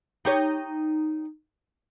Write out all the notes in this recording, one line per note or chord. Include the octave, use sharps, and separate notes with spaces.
D#4 G4 C#5